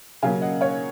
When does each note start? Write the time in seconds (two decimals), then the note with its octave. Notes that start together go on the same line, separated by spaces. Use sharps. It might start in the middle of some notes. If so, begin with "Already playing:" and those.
0.23 C#3 F#3 A#3 C#4 F5 G#5
0.41 D#5 F#5
0.61 C#5 F5